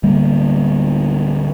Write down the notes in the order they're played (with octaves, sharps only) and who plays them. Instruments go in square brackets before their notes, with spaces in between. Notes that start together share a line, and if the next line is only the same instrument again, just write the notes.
[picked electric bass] D1 D3 G3 A#3